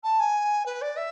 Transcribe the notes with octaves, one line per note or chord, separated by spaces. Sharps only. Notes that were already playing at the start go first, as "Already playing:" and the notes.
A5
G#5
B4
D5
E5